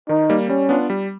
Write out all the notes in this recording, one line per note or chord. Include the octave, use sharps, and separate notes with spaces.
D#3 D#4
G3 A#3
G3 C#4
B3 D4 F4
G3